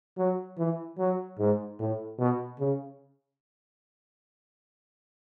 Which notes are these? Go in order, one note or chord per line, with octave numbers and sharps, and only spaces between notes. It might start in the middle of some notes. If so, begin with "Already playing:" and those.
F#3
E3
F#3
G#2
A2
B2
C#3